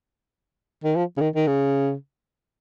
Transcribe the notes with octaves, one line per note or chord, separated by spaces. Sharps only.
D#3
F3
C#3
D#3
D#3
C#3